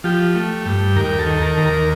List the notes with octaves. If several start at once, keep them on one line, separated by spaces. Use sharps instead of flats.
F3 G4
A3
G2
D#2 A#4
G4
A4
D#3
A#4
D#2
A#4